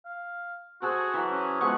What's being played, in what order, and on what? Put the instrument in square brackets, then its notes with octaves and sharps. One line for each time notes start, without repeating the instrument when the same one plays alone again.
[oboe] F5
[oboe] F#4 [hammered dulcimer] G#4 A4 C5
[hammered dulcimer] E3 F#3
[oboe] C#4
[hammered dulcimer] F3 G#3 B3 [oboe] C#6